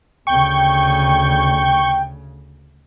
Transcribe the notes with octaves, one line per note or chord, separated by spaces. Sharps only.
D2 C#3 G5 C#6 G6